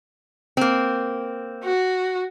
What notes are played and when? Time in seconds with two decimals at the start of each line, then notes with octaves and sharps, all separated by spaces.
0.57 A#3 C4
1.63 F#4